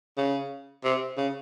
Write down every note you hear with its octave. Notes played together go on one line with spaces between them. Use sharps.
C#3
C3
C#3